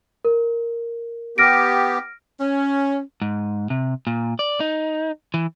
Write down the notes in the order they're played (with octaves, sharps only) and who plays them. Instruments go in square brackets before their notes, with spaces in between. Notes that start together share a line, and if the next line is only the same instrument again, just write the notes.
[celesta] A#4
[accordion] B3 G4 [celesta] F6 A#6 D7
[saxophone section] C#4
[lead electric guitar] G#2
C3
A#2
D5
D#4
E3